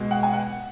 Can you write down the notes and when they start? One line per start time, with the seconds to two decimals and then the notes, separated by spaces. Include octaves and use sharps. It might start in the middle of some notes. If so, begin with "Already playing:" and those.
Already playing: B2 G#3
0.11 F#5
0.23 G#5
0.33 F#5